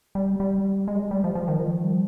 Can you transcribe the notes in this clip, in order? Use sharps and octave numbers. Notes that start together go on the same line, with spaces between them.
G3
G3
G#3
G3
G#3
G3
F3
F3
D#3
F3
G3